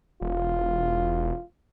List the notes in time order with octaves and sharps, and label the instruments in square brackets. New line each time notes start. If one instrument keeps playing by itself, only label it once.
[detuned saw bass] E1 [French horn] F4